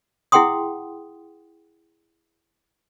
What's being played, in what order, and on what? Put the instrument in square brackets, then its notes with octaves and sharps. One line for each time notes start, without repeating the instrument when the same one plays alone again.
[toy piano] E4 G#4 F#5 G5 C6 D#6